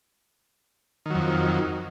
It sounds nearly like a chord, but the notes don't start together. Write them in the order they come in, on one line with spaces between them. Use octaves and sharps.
D#3 F#3 F2